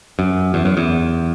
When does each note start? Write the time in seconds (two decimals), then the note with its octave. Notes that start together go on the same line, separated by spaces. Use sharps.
0.19 F#2
0.54 E2
0.65 F#2
0.77 E2